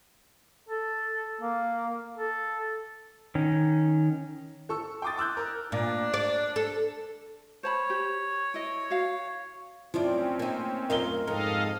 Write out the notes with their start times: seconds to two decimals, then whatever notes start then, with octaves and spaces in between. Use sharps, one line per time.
0.69 A4
1.41 A#3
2.16 A4
3.35 D#3 C#4
4.69 A4 C#6 E6
5.02 G5 C6 D6 D#6 A6
5.17 D6 E6 F#6 G6
5.37 A#4
5.72 A#2 D4
6.14 D5
6.56 A4
7.63 C5 C#5 A5 B5
7.90 G4
8.54 E4 D#5
8.90 F#4 F5
9.94 F#2 F3 C4 C#4 E4 F4 D5
10.39 A#3 D#4
10.90 F#2 F4 A#4 D#5 F5 G7
11.27 F2 G#2 A4 A#4 D#5 F5